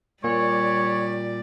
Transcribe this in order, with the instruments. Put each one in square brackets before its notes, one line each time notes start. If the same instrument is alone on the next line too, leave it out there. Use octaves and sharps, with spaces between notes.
[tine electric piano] A#2 [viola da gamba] G3 D5 [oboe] C#5